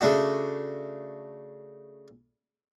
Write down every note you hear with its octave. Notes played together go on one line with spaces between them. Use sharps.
C#3 A3 D4 F#4